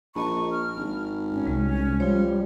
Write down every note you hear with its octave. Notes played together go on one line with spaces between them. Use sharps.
A#1 D#5 A5 B5 C#6
F6
G#1
G#2 C#4
C2 G#3
F3 G3 F4 C#5